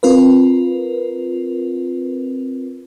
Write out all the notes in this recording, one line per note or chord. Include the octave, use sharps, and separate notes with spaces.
C4 F4 A#4 B4